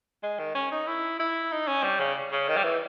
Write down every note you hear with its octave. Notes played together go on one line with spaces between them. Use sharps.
G#3
D#3
C#4
D#4
E4
E4
D#4
C#4
G3
C#3
C#3
D#3
G3
E3